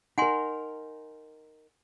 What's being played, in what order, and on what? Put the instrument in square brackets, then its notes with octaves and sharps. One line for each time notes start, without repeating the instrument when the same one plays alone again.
[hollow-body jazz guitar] D#4 A#4 [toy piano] F#5 G#5 C6